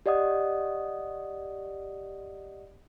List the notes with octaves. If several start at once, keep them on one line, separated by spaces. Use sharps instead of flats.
G4 D5 D#5 F#5 D#6